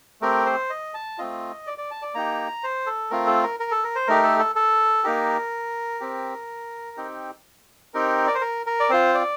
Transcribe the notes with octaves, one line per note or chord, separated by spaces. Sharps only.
A3 C4 G4 A#4
C5
D#5
A5
A3 C4 F4 D#5
D5
D5
A5
D5
A#3 D#4 G4 A#5
C5
A4
A3 C4 F4 A#4
A4
A#4
A#4
A4
A#4
C5
A3 D#4 G4 A#4
A4
A4
A4
A#3 D#4 G4 A#4
C4 G4
C4 D#4 G4
C4 D#4 G4 A#4
D5
C5
A#4
A#4
D5
C4 F4 C5
D5